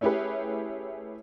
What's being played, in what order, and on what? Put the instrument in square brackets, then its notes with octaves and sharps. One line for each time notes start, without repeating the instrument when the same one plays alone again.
[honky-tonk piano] A3 C#4 E4 G4 G#4 B4